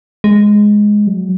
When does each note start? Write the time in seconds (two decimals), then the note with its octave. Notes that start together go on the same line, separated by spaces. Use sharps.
0.24 G#3
1.07 F#3